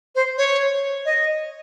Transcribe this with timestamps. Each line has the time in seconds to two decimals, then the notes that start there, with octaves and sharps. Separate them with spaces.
0.15 C5
0.38 C#5
1.05 D#5